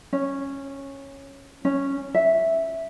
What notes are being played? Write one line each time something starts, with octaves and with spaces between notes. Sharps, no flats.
C#4
C#4
E5